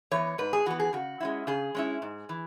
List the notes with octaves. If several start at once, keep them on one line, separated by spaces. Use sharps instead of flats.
E3 B3 C#5
G#2 B4
G#4
E3 B3 F#4
G#4
C#3 F#4
G#3 C#4 E4
C#3 G#4
G#3 C#4 E4
G#2
E3